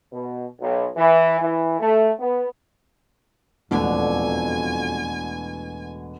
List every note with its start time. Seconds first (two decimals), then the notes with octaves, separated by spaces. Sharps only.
0.12 B2
0.60 B1
0.96 E3
1.40 E3
1.79 A3
2.18 B3
3.71 E1 A1 F2 B2 D3 G#5